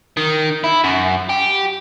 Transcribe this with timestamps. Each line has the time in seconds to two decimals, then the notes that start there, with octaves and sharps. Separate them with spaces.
0.17 D#3
0.64 E4
0.84 F#2
1.29 G4